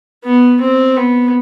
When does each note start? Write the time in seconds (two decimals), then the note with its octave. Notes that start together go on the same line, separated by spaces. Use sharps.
0.24 B3
0.61 C4
0.97 B3